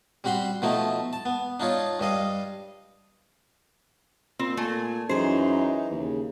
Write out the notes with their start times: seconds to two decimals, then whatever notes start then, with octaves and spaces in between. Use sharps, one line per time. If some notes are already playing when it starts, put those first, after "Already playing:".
0.24 G3 C4 F#4 B5 C6
0.62 B2 F3 A3 D#4 E4
1.13 A5
1.25 B3
1.60 D4 D#4 F4 C#5
1.99 G2 G3 D#5 F5
4.39 A#2 C4
4.57 A#2 A3 G#5
5.09 F#2 E3 D#4 G#4 C5
5.91 D#2 C#3